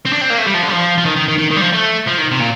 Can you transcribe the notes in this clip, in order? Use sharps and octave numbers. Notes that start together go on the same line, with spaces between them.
C4
D4
C4
A#3
A3
G3
F3
D3
G3
F3
F3
D#3
D#3
D#3
D#3
D#3
G3
F3
A3
F3
D#3
C3
A#2